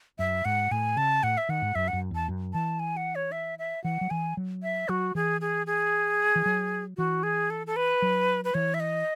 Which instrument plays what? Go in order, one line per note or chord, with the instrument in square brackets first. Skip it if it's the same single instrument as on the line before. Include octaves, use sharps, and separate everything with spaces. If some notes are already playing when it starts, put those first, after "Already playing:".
[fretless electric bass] F#2 [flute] E5
[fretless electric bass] G#2 [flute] F#5
[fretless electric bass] A2 [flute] G#5
[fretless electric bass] C#3 [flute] A5
[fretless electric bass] A2 [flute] F#5
[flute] E5
[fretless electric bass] D#3 [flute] F#5
[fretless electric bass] G#2
[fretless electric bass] F#2 [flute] E5
[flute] F#5
[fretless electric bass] F#2
[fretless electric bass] E2 [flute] A5
[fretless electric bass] F#2
[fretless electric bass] E3 [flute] A5
[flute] G#5
F#5
C#5
E5
E5
[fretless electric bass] E3 [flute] F#5
[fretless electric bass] F#3
[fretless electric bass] E3 [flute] G#5
[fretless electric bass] F#3
[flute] E5
[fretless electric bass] F#3 [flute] F#4
[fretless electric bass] E3 [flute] G#4
[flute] G#4
G#4
[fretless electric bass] E3
F#3
[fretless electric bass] E3 [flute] F#4
[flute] G#4
A4
A4
B4
[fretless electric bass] F#3
[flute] B4
[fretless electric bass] E3 [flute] C#5
[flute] E5
D#5